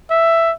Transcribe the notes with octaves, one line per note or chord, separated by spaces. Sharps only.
E5